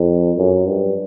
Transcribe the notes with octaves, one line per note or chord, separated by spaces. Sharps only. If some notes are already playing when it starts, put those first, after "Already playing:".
Already playing: F2
F#2
G2